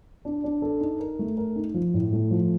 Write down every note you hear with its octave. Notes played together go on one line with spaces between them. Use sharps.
D4
D4
A4
D#4
A#4
A3
A#4
D#4
F3
A2
A3
F3